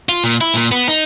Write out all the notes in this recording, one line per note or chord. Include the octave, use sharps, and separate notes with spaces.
F4
A#2
E4
A#2
B3
D#4